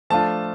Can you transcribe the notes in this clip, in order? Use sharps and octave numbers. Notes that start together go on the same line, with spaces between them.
F3 A3 D4 F4 A5